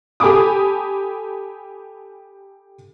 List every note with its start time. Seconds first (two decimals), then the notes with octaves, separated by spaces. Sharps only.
0.20 G4 A4 G#5 B5 D6 D#6